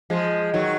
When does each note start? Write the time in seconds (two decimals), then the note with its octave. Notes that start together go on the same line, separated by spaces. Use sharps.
0.10 F3 G#3
0.54 D#3 F#3